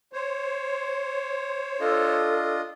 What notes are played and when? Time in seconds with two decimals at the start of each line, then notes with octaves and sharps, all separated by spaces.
0.13 C5 C#5
1.80 D4 F4 A4 D#5